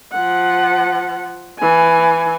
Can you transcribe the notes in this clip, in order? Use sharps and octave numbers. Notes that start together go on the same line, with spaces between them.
F3 F#5
E3 G#5